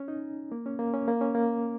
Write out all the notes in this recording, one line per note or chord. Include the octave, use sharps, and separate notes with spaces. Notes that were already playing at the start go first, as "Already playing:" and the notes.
Already playing: C#4
D#4
A#3
C#4
A#3
C#4
A#3
C#4
A#3